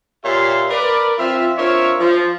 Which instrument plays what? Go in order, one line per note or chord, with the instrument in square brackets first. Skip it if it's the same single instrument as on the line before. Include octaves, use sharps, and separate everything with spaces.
[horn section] A#2 G4 C#5 E5 F5 C6
A#4 B4 D5
F3 C4 F4 E5
C4 D4 F4 A#4 C#5 E5
F3